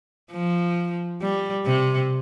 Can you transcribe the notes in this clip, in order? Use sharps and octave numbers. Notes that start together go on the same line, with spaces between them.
F3
G3
C3